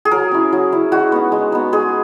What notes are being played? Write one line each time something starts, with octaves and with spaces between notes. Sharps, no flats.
G#4
F#3 A#4
C#4 E4
F#3
C#4 E4
G#3 F#4
B3 D#4
G#3
B3 D#4
G#3 G#4